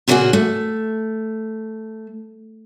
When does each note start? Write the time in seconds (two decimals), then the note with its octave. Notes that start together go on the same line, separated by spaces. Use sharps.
0.08 A#2 C#3 A#3 E4 F#4 G#4
0.33 A3